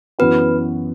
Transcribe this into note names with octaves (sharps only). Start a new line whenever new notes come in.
F#2 E3 B3 F#4 B4